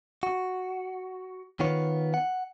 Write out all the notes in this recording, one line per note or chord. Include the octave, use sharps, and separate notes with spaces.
F#4
D#3 B3 F4 C#5
F#5